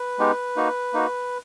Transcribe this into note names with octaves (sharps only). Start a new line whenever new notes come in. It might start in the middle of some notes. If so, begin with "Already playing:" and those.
Already playing: B4
G#3 B3 D#4 G4
A#3 D#4 F#4
A#3 D#4 F#4